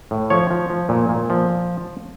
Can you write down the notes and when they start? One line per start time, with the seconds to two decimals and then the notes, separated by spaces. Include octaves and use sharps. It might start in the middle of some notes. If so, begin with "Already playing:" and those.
0.11 A2
0.30 F3 C#5
0.50 F3
0.70 F3
0.89 A#2
1.09 A#2
1.30 F3